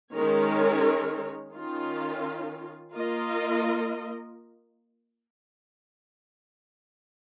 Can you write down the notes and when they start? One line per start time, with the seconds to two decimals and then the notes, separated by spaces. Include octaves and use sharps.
0.12 D#3 G#3 C#4 A#4 C#5
1.54 D#3 C#4 F4
2.94 A#3 F4 A#4 D#5